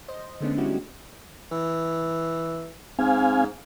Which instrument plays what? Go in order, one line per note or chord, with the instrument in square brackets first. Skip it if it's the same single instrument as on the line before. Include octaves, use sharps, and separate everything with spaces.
[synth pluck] C5 D#5
D3 G#3 A3 B3 C#4 D4
G3 G#3 C#4 E4 F#4 G4
[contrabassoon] E3
[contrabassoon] G#2 [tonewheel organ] C4 F5 G#5